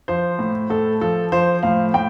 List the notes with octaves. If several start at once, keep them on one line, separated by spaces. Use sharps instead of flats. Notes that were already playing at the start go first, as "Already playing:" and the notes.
F3 C5
A2
A2 A4
F3 A4
F3 C5
A2 F5
A2 G5